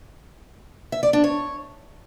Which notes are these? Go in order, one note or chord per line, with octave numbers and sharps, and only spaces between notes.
E5
D5
D4
C#5